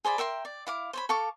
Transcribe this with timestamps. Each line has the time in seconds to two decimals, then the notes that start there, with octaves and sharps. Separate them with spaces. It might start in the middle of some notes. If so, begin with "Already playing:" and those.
0.05 G#4 C5 D5 B5
0.18 A#4 E5 G5 C6
0.45 D5
0.67 E4 F5 D6
0.93 C5 C#5 B5
1.09 A4 F5 C#6 D6